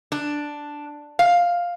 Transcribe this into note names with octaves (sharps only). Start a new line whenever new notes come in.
D4
F5